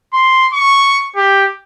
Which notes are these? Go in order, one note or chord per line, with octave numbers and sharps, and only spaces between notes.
C6
C#6
G4